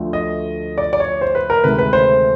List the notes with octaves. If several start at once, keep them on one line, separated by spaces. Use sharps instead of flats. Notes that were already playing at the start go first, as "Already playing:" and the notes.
Already playing: D2 D3 F3 A3
D#5
D5
D5
C#5
C5
B4
A#4
D2 C3 D#3 G#3 B4
B4
C5